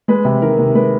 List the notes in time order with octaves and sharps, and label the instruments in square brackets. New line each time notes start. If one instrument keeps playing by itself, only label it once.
[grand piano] G#3 B4
C3
D#3 A#4
C3
G#3 B4